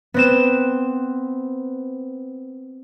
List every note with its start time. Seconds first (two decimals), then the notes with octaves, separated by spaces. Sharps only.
0.14 B3 C4 E7